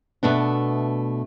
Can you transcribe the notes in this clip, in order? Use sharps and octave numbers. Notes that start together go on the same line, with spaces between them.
B2 A3 B3 D4